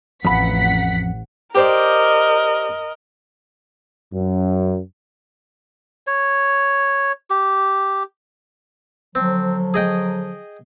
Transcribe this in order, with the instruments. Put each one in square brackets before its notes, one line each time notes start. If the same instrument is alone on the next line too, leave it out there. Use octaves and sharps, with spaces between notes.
[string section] A1 F#5 B6 [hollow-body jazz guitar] F2 B5
[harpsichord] G4 C5 D5 [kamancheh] A#4 D#5
[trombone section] F#2
[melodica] C#5
G4
[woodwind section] D3 F3 F#3 [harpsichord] C4
[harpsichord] G#4 D#5 G5